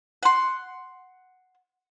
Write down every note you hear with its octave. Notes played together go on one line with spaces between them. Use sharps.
F#5 C6